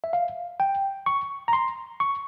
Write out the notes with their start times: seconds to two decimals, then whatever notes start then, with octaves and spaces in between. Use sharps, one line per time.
0.04 E5
0.13 F5
0.60 G5
1.06 C#6
1.48 A#5
1.53 C6
2.00 C#6